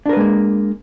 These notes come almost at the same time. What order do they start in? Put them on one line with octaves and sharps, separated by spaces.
D4 A#4 B4 G#3 A#3